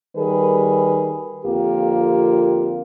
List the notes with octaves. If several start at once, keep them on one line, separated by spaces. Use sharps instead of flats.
D#3 G3 G#4 A#4 B4
F2 D3 A#3 F4 G4